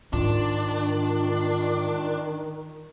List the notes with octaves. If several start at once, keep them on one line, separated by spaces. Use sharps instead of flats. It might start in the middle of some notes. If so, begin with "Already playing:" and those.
G#2 D#3 D4 F4